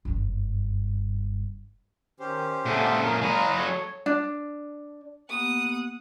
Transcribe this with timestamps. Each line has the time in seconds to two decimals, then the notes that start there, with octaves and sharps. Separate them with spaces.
0.05 F#1 G2
2.20 D#3 C#4 G4 C5
2.65 A#2 C#3 G#4 A4 E5 F#5
3.03 A3 C#4 A#4 A5
3.22 F#3 G#3 F4 G#4 F5 A#5 B5
3.57 A4 C#5
4.06 D4
5.29 A#3 B3 G4 F#5 D#6